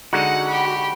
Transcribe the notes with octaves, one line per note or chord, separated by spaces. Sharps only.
D3 G#3 D#4 F#4 F#5
G4 B5